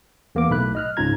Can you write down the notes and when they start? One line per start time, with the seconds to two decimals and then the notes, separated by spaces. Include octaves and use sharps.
0.35 E2 A#3 B3 D6
0.49 B1 A2 A3 B5 F#6
0.75 D#5 F6 F#6
0.97 C#2 G#2 C#4 F4 A#5 G#6